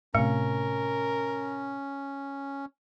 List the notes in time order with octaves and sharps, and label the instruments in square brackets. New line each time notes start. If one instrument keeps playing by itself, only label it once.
[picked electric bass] A2 C3 [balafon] A3 [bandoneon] C#4 [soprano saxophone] A#4